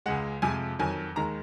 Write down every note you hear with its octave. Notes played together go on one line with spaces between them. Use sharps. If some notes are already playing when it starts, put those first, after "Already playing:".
C#2 C#3 G#3 F#5
F2 C3 F3 G#3 G#5
F2 D#3 F#3 G#5
D#2 D#3 G#3 A#5